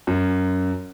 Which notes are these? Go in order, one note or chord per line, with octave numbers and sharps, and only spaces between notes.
F#2